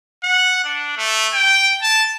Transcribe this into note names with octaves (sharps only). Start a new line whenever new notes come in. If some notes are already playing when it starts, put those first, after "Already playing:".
F#5
D4
A3
G5
A5